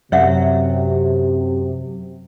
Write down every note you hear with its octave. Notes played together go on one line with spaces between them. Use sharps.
F#2 C3 F#3 C#5 E5 F#5